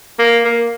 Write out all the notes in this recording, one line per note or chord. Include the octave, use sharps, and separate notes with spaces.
A#3
A#3